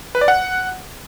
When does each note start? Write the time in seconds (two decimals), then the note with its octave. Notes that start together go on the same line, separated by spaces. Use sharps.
0.15 B4
0.21 D5
0.28 F#5